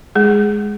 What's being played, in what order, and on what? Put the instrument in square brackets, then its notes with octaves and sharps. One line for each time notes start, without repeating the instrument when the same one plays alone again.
[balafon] G#3 G#4